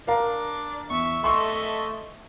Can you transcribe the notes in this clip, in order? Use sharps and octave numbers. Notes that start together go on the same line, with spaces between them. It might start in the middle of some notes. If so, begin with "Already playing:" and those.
D4 A#4 F5 A#5
E2 E5 C#6
A3 A4 D#5 E5 C6 C#6 E6